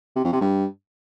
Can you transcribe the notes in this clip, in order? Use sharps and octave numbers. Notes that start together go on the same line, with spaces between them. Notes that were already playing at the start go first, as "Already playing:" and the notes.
C3
F2
C3
G2